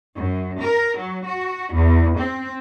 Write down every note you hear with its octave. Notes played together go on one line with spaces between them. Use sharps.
F#2
A#4
F#3
F#4
E2
C4